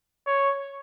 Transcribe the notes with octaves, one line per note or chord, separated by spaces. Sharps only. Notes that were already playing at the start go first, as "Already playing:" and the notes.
C#5